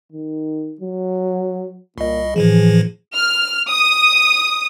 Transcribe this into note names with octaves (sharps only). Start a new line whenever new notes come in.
D#3
F#3
C2 A#2 D#5
A2 E3 F3 G#4
F6
D#6